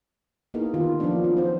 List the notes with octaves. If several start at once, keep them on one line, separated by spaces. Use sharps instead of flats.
A#3 B3 D#4 E4 G#4 A#4
D#3 F4 G4
F3 F#3 A#3 B3 D4 D#4
F#3 C#4 F4
C4 C5